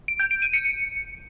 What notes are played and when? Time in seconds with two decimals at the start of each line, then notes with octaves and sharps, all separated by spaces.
0.08 D7
0.20 G6
0.31 D7
0.42 D#7
0.53 C#7